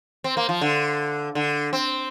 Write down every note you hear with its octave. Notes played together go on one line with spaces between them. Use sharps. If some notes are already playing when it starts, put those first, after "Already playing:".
C4
A#3
F3
D3
D3
C4